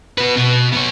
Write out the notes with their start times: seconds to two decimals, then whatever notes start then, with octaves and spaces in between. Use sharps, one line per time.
0.18 F#4 B4
0.36 B2 B3
0.72 B3 C#5